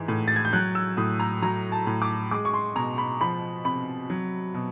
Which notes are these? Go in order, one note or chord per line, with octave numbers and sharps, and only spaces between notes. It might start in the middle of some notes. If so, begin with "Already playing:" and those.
Already playing: G#2 E3
A2
A6
G#6
G6
F#3 F#6
E6
A2 D#6
A#5
F#3 A#5
A5
A2
D6
G#3 D6
C#6
C6
B2 A#5
B5
F3 B5
C3 B5
F#3
B2